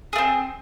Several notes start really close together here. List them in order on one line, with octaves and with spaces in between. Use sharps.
G#4 A3 C4